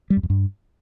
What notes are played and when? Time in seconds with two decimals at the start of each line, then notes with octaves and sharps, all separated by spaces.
0.10 G3
0.17 F#2
0.23 F2
0.30 G2